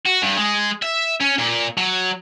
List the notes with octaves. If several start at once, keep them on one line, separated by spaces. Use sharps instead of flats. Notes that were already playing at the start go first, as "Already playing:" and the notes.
F#4
G2
G#3
E5
C#4
A#2
F#3